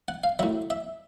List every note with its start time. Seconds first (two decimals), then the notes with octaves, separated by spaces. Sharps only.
0.08 F#5
0.24 F5
0.39 A2 F#3 E5
0.70 E5